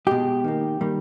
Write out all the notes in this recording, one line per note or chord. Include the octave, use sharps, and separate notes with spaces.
B2 G#3 G4
D#3 A#3
D#3 G3 A#3